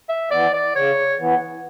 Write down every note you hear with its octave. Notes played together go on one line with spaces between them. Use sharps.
E5
E3 B3 D5
D5
C#3 C#5
E3 B3